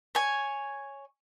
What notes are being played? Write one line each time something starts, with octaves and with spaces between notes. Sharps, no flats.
C#5 G#5